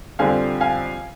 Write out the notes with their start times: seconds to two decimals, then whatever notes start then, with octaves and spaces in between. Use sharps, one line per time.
0.19 F2 D3 G3 C4 F5 G#5
0.61 F5 G#5